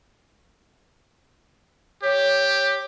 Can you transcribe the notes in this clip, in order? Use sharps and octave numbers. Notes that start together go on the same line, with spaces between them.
G4 C#5